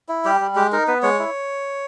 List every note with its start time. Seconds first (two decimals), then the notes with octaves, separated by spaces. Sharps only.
0.09 E4
0.25 G3 G4
0.40 G3
0.55 G#3 G4
0.72 D#4 A#4
0.87 B3 B4
1.03 G#3 C#5
1.19 E4